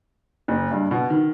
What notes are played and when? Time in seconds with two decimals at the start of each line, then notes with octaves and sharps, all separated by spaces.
0.48 F#1
0.71 G2
0.91 B2
1.10 D#3